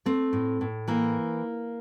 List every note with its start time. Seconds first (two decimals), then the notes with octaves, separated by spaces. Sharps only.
0.06 A3 C4
0.33 A2
0.61 A2
0.88 E3 A#3